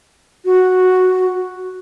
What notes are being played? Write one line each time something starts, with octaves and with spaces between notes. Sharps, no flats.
F#4